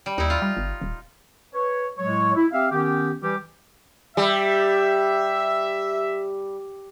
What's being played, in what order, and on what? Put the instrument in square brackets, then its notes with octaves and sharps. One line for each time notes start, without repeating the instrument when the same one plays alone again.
[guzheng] G3
[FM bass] D#2 [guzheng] D#4 E4
[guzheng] F4
[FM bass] G3
G1
D#1
[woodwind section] B4 C#5
A2 F#3 G#3 C#5
E4
C4 G4 E5 F5
D#3 B3 C#4 G4
E3 G3 G4
[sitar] G3 [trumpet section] E5